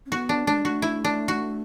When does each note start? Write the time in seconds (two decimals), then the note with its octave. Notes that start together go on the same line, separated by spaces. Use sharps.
0.06 C#4
0.12 B3 F#4
0.29 D4
0.47 A3 D4
0.56 G#3
0.65 A3 F#4
0.82 E4
1.04 D4
1.28 F#4